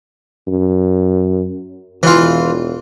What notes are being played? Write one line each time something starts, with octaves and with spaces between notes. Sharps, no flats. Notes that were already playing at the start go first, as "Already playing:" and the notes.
F#2
E1 E3 F4